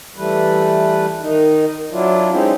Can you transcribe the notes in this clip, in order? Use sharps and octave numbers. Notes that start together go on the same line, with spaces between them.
E3 G3 A3 B4
D#3 D#4
F#3 D4 E4 F4
G#3 C4 C#4 D#4 E4 G4